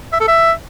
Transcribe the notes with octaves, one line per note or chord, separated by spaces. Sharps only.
E5
A4
E5